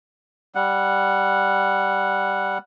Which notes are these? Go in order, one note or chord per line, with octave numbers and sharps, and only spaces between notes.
G3 F#5